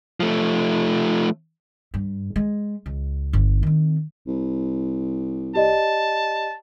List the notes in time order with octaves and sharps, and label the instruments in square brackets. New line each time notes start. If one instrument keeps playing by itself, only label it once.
[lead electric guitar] F3 A3
[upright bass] G2
G#3
C#2
G1
D#3 C4
[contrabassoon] C2
[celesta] G4 D5 D#5 [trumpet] A5